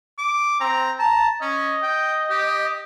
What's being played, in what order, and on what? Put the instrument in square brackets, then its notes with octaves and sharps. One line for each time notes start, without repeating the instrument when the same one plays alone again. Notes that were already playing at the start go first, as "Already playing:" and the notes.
[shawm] D6
[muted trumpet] C4 [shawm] A#5
[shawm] A5 [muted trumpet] A#5
[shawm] C#4 [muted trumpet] D#5
[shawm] G5
G4